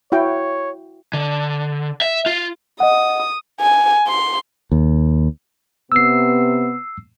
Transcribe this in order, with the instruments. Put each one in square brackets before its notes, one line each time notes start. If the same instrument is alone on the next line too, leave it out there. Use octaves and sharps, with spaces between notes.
[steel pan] E4 F#4 G5 [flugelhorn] C#5
[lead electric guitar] D3
E5
F4
[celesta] D#5 F#5 [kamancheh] D#6
[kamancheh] G#5
C6
[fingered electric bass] D#2
[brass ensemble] C3 B3 [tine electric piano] E6 C7